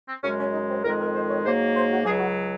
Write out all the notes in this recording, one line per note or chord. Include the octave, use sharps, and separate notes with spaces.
C4
F#2 C#3 G#3 C#4
C#4
D#4
C4
F2 D#3 G#3 A#4
A#4
C5
C#5
G#2 F#3 A#3 C5
C5
F#4
C#2 C#3 F#3 G#4
F#4